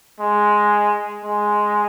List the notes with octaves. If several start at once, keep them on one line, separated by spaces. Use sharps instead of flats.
G#3
G#3